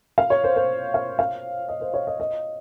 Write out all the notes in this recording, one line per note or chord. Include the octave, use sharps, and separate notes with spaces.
F5
C#5
C5
C5
F5
F5
D#5
C5
C#5
D#5
D#5